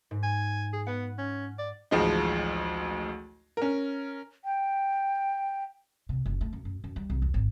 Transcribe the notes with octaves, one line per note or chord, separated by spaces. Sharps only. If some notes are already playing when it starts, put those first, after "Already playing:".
G#2
G#5
G#4
B3 F#5
C#4
D5
A1 D2 F3 G#3 D#4
C#4 A#4
G5
C3
F#1
A3
F#2
F#2
F#2
G3
C2
E2
G#1